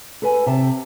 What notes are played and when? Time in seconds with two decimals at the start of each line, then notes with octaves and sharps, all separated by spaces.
0.22 A4 B4 G#5
0.46 C3 G4 A5